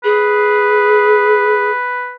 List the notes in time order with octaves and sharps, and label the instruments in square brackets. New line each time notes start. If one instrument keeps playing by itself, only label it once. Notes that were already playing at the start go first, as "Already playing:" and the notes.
[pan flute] G#4 [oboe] B4